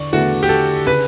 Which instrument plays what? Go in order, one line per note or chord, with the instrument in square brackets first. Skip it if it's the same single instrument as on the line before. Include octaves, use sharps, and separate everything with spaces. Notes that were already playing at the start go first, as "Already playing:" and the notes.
Already playing: [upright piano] E2 D3 [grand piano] D5 C#6
[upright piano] E2 D3 A3 E4 [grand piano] F#4
[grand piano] G4
A4
[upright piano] C#3 [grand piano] B4